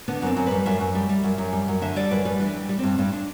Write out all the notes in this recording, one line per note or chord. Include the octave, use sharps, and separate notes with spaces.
D3 B3
F#2 C4
F#2
G3 B4
F#2 E5
F#2
G3
G3
F#2
F#2
G3
F#2
D3 E5
G3 D5
F#2 B4
G3 B4
E3 D4
G3
G3
G2 C4
G2 D4
D4